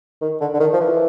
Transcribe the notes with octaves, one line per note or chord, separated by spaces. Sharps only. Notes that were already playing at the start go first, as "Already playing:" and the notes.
D#3
D3
D3
D#3
F3
E3